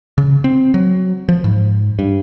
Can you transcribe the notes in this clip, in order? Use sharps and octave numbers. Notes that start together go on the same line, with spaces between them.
C#3
C4
F#3
F3
G#2
G2